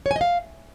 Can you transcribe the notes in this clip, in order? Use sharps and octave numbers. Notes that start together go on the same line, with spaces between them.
C#5
G#5
D#5
F5